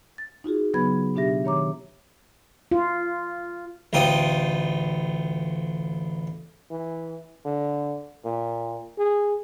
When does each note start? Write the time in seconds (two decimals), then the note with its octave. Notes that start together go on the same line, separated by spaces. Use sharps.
0.18 A6
0.44 D#4 F4 F#4 G#4
0.74 C#3 F#3 B3 B4 B5 G#6
1.15 B2 D4 G4 E5 A#6
1.44 D#3 C#5 A#5 D6
2.71 F4
3.93 A1 D2 F4 G5 D#6
6.71 E3
7.45 D3
8.25 A#2
8.98 G#4